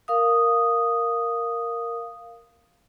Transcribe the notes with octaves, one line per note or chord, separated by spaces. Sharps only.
A#4 F5 D#6